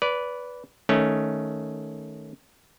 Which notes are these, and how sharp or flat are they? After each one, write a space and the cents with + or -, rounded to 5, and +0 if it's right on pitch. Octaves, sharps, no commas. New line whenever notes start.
B4 +0 D5 -25
D#3 +0 A3 -10 C#4 +0